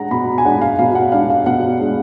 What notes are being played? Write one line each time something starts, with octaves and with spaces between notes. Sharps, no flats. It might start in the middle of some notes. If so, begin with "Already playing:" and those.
Already playing: G#3 D4 F#5 A#5
B2 B5
G#5
G#3 D4 F#5
F5
B2 F5
F5
F#5
G#3 D4 F5
F5
B2 F#5
G#3 D4